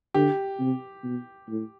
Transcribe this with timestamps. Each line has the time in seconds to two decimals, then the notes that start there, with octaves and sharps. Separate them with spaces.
0.14 D3 G4
0.60 C3
1.04 B2
1.48 A2